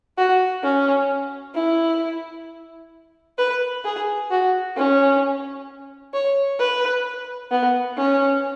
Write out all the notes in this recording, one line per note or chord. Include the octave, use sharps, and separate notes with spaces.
F#4
C#4
E4
B4
G#4
F#4
C#4
C#5
B4
B3
C#4